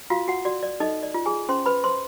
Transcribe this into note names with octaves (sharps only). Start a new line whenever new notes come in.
F4 F#4 F5
F#4 F#5
F#4 D5
D5
D#4 A4 D#5
D5
F4
G#4 G#5
C#4 C5 C6
B4 B5
C5 C6